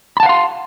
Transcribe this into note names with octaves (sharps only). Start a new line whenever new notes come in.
F5 F#5 A5 B5 C6